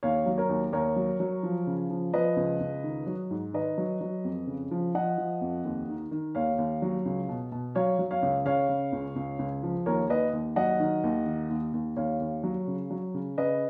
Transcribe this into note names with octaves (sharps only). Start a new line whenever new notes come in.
D#2 C#5 F5
F#3
A#4 C#5
D#2
D#2 A#4 C#5
F#3
F#3
F3
C#3
F3
F3 B4 D#5
C#2
C#2
D#3
F#3
G#2
D#3 B4 D#5
F#3
F#3
F2
C#3
F3
F3 D#5 F#5
F3
F2
D#2
D#3
D#3
D#2 C#5 F5
D#2
F#3
C#2
B2
B2
F#3 C#5 F5
F#3
C#5 F5
C#2
C#3 C#5 F5
C#3
C#2
C#2
C#2
F3
D#2 A#4 C#5
D#2 B4 D#5
D#2
F#3 D#5 F#5
D#3
D#2
D#3
D#2
D#2
D#2 C#5 F5
D#2
F#3
C#3
F#3
C#3
C#3 B4 D#5